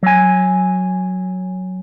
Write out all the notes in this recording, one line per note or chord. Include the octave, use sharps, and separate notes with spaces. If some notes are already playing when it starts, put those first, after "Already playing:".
F#3 G#5